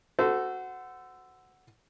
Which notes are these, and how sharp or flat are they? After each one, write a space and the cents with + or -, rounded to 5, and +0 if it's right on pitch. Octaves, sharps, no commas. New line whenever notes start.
F#4 +0 A4 +0 C5 -30